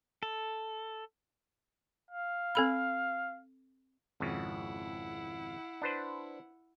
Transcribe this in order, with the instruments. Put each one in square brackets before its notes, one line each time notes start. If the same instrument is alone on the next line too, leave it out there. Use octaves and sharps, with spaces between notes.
[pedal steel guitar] A4
[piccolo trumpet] F5
[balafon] C4 A4 B5
[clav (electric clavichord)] G#1 F2 C#3 [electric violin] E4 F#5
[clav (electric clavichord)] D4 B4 C5